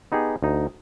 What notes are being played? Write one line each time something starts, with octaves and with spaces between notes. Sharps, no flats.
B3 D#4 G4 G#4
D2 D#4